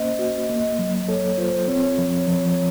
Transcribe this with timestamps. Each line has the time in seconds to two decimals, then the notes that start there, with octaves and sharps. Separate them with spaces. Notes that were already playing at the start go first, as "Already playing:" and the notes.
Already playing: A#3 C#4 C5 D#5
0.19 F#4
0.49 A#3
0.79 F#3
1.08 A4 C#5
1.38 F4 C5
1.68 C4 C#5
1.98 F3
2.27 F3